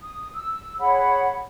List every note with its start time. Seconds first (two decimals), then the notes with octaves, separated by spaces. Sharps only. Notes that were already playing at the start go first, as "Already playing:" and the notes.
0.02 D#6
0.35 E6
0.80 G#4 C#5 F#5 B5